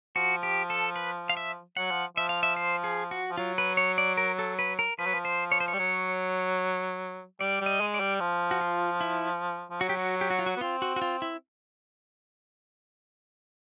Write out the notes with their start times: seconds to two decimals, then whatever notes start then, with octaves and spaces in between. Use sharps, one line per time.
0.16 F3 F#4
0.43 G4
0.70 A4
0.96 B4
1.29 F5
1.37 E5
1.77 F#3 F#5
1.91 F3
2.17 F3 E5
2.29 F5
2.43 E5
2.56 C5
2.84 G#4
3.11 F#4
3.30 F3
3.37 F#3 F4
3.58 B4
3.77 C#5
3.98 D5
4.17 A#4
4.39 A4
4.59 B4
4.79 A#4
4.98 F3 B4
5.06 F#3
5.14 F3
5.25 C5
5.52 C#5
5.60 C5
5.68 C#5
5.73 G3
5.79 F#3
7.40 G3 D5
7.61 G3
7.66 D#5
7.80 G#3
7.94 D5
8.00 G3
8.20 F3
8.51 F#4
8.61 F4
9.01 E4
9.70 F3
9.81 F#3 F#4
9.89 G4
9.97 F#4
10.21 G4
10.30 F#4
10.39 F4
10.46 F#4
10.57 B3
10.61 C4 F4
10.82 F#4
10.96 F#4
11.02 F4
11.22 E4